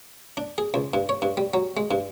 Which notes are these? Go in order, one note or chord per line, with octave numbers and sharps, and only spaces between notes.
D4
G#4
C#2
G2
C#5
G2
G3
F#3
G#3
G2